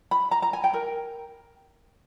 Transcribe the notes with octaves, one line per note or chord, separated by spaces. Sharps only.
B5
A#5
A#5
G#5
G5
A#4